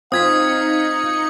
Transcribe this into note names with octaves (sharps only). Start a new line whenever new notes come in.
C4 D#4 F4 F5 D#6 G#6 B6 C#7